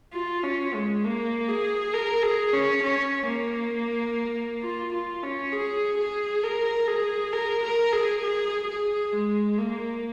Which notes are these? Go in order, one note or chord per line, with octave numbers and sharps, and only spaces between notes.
F4
C#4
G#3
A#3
G#4
A#4
G#4
C#4
C#4
A#3
F4
F4
C#4
G#4
G#4
A#4
G#4
A#4
A#4
G#4
G#4
G#4
G#3
A#3